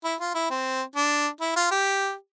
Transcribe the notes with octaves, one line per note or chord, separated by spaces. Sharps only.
E4
F4
E4
C4
D4
E4
F4
G4